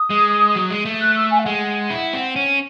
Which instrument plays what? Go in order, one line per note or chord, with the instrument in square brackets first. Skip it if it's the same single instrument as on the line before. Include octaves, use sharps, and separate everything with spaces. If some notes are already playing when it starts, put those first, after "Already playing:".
Already playing: [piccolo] D#6
[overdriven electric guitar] G#3
F#3
G#3
A3
[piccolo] F#6
E6
G#5
E5
[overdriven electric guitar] G#3 [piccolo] F#5
[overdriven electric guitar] E4
C4
C#4